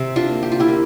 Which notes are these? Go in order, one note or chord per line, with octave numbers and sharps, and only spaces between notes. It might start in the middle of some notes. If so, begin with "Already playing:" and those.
Already playing: C3 C4
D4 F4
A#3
G4
F4
E4 G4
A#3